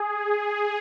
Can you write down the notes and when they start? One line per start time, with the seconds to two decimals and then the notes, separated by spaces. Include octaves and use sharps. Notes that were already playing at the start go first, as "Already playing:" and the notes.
Already playing: G#4